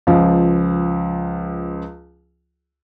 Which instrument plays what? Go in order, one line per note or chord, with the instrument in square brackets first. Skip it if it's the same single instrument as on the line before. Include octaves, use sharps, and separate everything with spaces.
[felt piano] C#2 F3